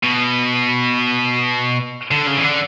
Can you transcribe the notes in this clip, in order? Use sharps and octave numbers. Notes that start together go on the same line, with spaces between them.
B2
D3
C#3
E3
D3